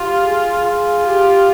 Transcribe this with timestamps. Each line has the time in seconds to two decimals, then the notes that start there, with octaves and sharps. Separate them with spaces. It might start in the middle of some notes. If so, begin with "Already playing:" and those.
Already playing: F4 G4
0.25 G#4
0.65 F4
1.07 G4